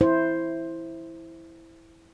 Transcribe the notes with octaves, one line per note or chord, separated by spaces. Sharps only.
E4 C5